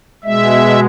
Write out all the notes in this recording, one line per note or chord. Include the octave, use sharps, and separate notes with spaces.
B2 G#3 E5